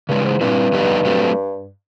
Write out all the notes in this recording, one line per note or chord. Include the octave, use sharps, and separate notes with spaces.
G2 C#3 E3 G#3
G#2
G2 A#2 G3 C4 E4
F2 D3 G3 B3 D#4
F#3 A3 C4